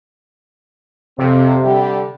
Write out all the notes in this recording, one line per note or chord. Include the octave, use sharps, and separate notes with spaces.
F2 C3 C4
D3 G3 G4